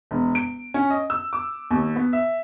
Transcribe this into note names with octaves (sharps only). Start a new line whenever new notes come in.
E1
D7
C#4
D#5
E6
D6
D#2
B3
E5